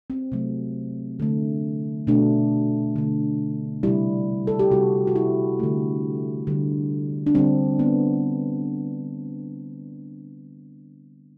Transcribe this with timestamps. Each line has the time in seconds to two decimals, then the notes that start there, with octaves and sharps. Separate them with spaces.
0.10 C4
0.32 C3 F#3 A3
1.20 D3 A3
2.07 B2 A3 D4
2.96 D3 A3
3.83 C3 G3 E4
4.47 A4
4.59 G4
4.71 C3 G3 F#4
5.07 F#4
5.16 E4
5.59 D3 A3
6.47 D3 G3
7.27 D4
7.35 D3 G3 C4
7.79 B3